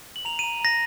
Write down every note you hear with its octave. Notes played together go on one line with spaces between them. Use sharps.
F#7
A#5 F7
A#5 D#7
A#5 A#6